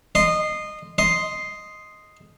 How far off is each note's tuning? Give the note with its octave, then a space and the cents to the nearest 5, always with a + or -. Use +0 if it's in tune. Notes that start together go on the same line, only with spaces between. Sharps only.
D#5 -20 C6 -5
D#5 +0 C6 +0